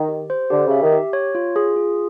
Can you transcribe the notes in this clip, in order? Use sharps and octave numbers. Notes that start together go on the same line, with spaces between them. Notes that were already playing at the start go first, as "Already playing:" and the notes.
Already playing: D#3
G4
C5
D3 G4
C#3
E5
D#3
G4
C#5
F4
G#4
F4